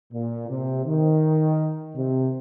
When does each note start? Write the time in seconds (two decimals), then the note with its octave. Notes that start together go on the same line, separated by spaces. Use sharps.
0.13 A#2
0.49 C3
0.86 D#3
1.95 C3